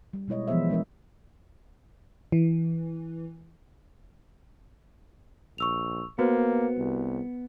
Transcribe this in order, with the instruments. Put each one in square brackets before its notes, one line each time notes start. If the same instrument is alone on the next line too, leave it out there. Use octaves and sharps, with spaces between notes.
[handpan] G3
B2 G#3 E4 C#5 D#5
E3 F3 B3 G#4 C5 E5
G#3 D4 A#4 E5
[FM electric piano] E3
[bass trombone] A#1 [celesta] C#6 E6 F7
[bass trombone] A#3 [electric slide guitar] B3 [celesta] F#4 B4 C5
[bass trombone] C2